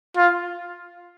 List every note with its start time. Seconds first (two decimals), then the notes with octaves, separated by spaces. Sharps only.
0.17 F4